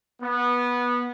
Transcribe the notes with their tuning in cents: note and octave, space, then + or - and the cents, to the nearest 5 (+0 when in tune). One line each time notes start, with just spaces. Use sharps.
B3 -15